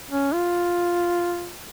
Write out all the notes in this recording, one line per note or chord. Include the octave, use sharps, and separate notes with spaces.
C#4
F4